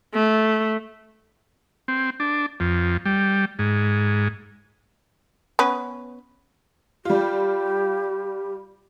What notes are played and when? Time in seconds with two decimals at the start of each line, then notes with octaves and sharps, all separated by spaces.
0.14 A3
1.88 C4
2.20 D4
2.60 F2
3.05 G3
3.59 G#2
5.59 B3 C#4 B4
7.05 G3 F4 G4